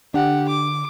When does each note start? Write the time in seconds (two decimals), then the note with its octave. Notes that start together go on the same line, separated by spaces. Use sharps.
0.14 D3 D4 G4 F#5
0.49 D6